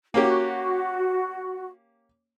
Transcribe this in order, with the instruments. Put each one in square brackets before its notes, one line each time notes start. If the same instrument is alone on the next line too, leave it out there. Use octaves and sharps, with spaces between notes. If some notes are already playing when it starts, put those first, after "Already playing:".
[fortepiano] A#3 C#4 G4 [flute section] F#4